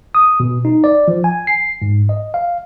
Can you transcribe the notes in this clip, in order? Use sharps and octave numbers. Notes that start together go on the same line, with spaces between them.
D#6
B2
D#4
D5
F3
G#5
C7
G#2
D#5
F5